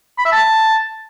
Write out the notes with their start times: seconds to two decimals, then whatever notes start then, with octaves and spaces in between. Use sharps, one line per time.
0.18 B5
0.25 E5
0.32 A5